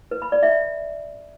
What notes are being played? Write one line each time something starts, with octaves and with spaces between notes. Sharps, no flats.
B4
B5
D5
E5